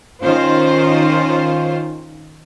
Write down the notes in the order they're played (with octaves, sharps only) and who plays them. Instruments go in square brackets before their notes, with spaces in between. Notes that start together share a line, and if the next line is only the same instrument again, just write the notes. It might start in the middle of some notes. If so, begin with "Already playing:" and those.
[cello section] D#3 C#4 F4 C5